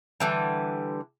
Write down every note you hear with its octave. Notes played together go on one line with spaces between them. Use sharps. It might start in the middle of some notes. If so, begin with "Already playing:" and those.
D3 E3 G3